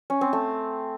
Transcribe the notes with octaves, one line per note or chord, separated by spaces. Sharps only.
C#4
C4
A3